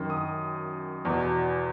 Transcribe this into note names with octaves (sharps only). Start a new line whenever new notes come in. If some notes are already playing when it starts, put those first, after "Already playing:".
Already playing: F#2 D#3
D#6
E2 B2